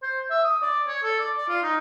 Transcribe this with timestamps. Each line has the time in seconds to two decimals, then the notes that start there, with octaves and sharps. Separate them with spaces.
0.03 C5
0.30 E5
0.44 D#6
0.62 D5
0.87 C#5
1.03 A4
1.20 D5
1.36 D5
1.48 F4
1.63 D#4